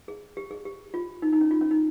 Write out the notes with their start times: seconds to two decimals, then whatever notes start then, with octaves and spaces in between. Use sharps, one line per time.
0.08 G#4
0.37 G4
0.51 G#4
0.65 G4
0.94 F4
1.22 D#4
1.33 D#4
1.41 C#4
1.51 F4
1.61 C#4
1.71 D#4